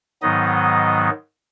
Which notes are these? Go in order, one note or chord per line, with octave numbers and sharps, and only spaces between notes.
G#2 D#3 F#3 B3 D#4 D#5